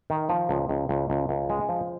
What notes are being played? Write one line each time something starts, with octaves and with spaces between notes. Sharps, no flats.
D#3
F3
C#2
C#2
C#2
C#2
C#2
G#3
F3